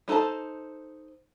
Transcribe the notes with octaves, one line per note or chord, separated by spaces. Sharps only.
G3 D#4 A4 C5 A5